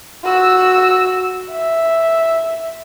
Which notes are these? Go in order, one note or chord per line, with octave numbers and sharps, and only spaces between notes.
F#4 E6
E5